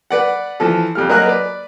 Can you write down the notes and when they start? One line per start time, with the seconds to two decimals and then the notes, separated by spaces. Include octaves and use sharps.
0.11 B4 D5 F#5
0.60 E3 F3 A4
0.95 F2 G3 F6
1.09 F#3 A#3 D#5 G#5 F6 F#6
1.26 B4 D5